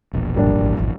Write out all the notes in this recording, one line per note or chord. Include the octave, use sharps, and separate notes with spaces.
E1 A#1 A#2
G#1 G3 A#3 D4